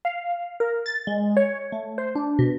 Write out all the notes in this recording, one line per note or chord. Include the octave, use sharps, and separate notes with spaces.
F5
A#4
A6
G#3
C#5
A3
C5
D4
B2